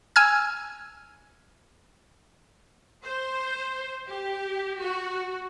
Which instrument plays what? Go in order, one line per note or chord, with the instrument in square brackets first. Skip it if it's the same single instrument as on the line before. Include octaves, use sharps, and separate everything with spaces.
[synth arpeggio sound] G#5 E6 F6 G#6
[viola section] C5
G4
F#4